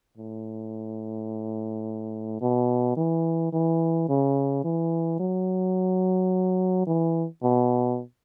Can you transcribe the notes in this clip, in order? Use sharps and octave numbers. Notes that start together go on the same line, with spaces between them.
A2
B2
E3
E3
C#3
E3
F#3
E3
B2